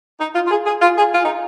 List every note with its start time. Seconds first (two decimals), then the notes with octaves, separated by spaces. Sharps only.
0.20 D#4
0.35 F4
0.46 F4
0.51 G#4
0.66 G#4
0.82 F4
0.98 G#4
1.13 F4
1.25 D#4